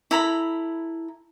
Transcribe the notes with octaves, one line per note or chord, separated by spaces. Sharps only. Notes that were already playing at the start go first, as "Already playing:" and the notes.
E4 A4 A#5 B5